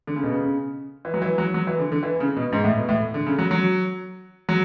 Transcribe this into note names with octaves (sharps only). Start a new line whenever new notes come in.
D3
C#3
B2
C#3
E3
F#3
E3
F#3
F#3
E3
D3
D3
E3
C#3
B2
G#2
A2
B2
A2
D3
C#3
F#3
F#3
F#3